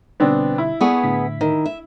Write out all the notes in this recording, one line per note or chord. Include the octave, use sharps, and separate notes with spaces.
B2 D3 G3 B3 C4 D4
E4
B3 G#4 A4 D5 C#6
A2 D3 B6
D#3
E5